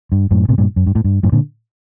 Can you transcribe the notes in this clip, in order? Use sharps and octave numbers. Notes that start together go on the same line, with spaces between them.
G2
F#2 A2
A2 C3
G2 A#2
F#2
G2
A2
G2
F#2 A2
A#2 D3